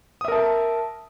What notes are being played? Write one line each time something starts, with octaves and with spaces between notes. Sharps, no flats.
A#4 E5 A5 D#6